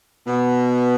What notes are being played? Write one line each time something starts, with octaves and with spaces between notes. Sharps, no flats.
B2 B3